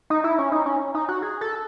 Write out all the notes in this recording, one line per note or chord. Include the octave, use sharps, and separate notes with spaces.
D#4
E4
C#4
D#4
C#4
D#4
F#4
G#4
A4